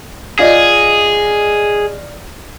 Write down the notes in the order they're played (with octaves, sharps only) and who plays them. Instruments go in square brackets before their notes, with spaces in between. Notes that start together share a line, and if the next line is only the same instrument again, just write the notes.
[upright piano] F4 D5 D#5 [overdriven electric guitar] G#4